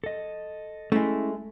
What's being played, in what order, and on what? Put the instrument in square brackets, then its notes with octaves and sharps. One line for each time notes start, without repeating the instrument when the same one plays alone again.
[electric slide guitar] A4 D#5
[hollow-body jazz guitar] G#3 A3 [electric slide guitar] C#4 E4